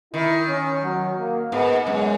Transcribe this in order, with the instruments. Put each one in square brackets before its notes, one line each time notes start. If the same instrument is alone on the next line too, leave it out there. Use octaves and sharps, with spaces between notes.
[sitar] D#3 [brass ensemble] E4
[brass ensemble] C#4
F#3
A#3
[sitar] G#2 [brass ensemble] B3
[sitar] F#2 [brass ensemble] G#3